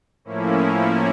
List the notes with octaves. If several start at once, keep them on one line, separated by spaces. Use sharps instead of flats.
A2 F3 A#3 C#4 E4